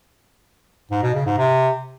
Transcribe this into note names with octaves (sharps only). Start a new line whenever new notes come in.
G#2
B2
C#3
G#2
C3